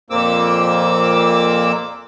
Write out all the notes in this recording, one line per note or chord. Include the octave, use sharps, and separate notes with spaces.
F2 A#2 A#3 C4 D6 E6